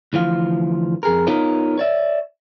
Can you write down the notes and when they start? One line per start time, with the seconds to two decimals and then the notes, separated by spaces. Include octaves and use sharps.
0.13 D2 E3 F3 F5
1.03 F2 G#4 A#4
1.27 B3 D#4 F4 A#4 C#5 D#5
1.78 C#5 D5 E5